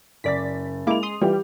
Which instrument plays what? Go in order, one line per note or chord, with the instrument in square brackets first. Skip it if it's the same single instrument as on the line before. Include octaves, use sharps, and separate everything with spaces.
[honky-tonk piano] F#1 A6 [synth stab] D5 B6
[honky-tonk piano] G#3 F7 [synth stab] A#3 E4 D6
[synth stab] C6 D#6
[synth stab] E3 [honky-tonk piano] G3 F4 G4